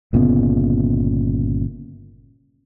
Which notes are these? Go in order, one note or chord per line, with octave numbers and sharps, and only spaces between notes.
G1 A#2 C#3 B3